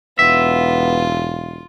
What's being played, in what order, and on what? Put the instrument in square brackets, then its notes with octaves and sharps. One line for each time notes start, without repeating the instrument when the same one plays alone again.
[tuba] E1 [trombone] B3 [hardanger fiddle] F4 [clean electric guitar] E5